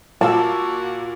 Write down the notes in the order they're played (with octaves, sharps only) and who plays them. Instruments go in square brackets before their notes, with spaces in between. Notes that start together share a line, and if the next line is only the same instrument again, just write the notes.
[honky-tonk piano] A#2 F4 E6 [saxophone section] F#4 [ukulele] A5